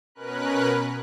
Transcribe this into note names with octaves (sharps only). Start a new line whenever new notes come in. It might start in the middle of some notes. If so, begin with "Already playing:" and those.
B2 C#4 A#4 B4 F#6